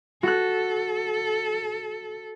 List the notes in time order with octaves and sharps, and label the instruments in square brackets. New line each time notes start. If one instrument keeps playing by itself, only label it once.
[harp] F#4 F#6 [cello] A4